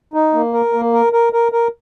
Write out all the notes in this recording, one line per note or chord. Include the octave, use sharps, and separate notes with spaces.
D#4
A#3
A#4
A#3
A#4
A#4
A#4
A#4